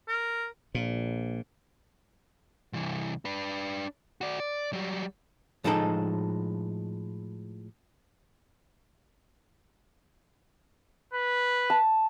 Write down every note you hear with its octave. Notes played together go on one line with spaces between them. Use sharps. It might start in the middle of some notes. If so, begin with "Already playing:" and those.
A#4
A#1 A#2
C2 E3
D4 B4
F#4 D5
D5
F#3 G3
A2 F3 G#3 D#4 A4 G5
B4
A5